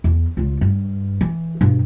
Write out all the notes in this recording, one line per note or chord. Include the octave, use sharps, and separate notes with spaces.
E2
C#2 F4
G2
E3
G2 B2